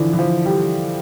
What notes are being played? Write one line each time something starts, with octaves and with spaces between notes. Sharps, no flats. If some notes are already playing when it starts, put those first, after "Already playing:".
Already playing: D3 E3 F3
E3
F3
G3